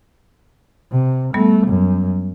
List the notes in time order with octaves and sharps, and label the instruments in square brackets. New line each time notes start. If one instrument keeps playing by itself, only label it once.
[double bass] C3
[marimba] G3 B3 [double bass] A3
[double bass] F#2